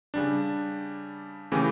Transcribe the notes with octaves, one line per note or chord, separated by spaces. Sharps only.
C#3 G3 D4
C#3 E3 A3 C#4 G4